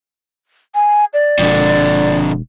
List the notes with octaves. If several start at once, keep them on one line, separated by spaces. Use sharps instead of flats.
G#5
D5
E1 F2 D3